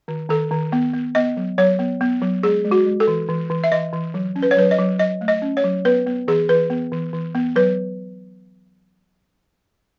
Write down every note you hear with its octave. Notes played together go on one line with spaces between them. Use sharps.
D#3
D#3 A4
D#3
B3
B3
B3 D#5
F#3
F#3 C#5
B3
B3
F#3
G#3 G#4
G#3
F#4
G#3
A4
E3
E3
E3
E5
E3 D#5
E3
F#3
C#4
B4
C#5
F#3 B4
D#5
F#3
F#3 D#5
A3
D#5
C#4
C#5
F#3
B3 B4
B3
E3 G#4
E3 B4
B3
E3
E3
B3
F#3 B4